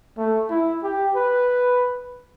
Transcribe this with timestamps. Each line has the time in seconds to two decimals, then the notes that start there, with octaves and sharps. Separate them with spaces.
0.17 A3
0.50 E4
0.84 G4
1.16 B4